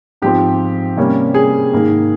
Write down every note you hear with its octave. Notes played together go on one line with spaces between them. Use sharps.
G#2 F3 C4 G4
C3 G3 A#3 C#4
G#4
G#2 D#3 A#3